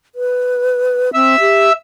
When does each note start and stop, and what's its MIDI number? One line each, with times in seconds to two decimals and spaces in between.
0.15 1.14 71
1.14 1.36 60
1.14 1.72 76
1.14 1.72 88
1.40 1.70 67